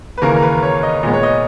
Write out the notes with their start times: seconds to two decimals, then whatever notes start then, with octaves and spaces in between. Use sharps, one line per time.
0.18 B4
0.22 D#2 C#3 E3 A#3 A#4
0.36 A#4
0.42 B4
0.63 C#5
0.83 D#5
1.03 A#2 G#3 B3 D#5
1.13 C#5
1.23 D#5